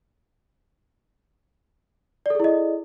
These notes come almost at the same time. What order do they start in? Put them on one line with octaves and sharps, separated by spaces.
D5 A4 G#4 E4 D#5